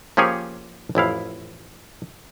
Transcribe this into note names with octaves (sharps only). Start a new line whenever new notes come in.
F3 A#3 C#4 G4 G#4 C#5
A1 F2 E4 F5